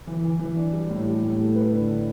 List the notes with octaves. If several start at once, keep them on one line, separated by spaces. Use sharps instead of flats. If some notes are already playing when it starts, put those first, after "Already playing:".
E3
E3
E3
D4
G3
A2
G4
A2
A3
B4
D3
D3